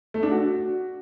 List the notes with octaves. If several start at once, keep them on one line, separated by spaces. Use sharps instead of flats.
A3
D4
F#4